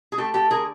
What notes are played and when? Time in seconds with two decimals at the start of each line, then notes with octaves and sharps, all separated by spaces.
0.12 G#4
0.18 A3 G4 A4
0.34 G4 A4
0.50 D3 G#4 A#4